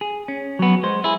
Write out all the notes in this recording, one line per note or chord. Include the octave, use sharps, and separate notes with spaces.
G#4
C#4
F#3 B3
G#3 C5
E4 G#4